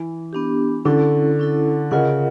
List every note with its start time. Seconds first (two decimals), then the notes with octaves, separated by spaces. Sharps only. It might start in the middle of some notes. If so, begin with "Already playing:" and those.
Already playing: E3
0.33 B3 D4 G4
0.85 D3 C#4 E4 A4
1.39 C#4 E4 A4
1.91 C#3 F4 A#4 D#5 F#5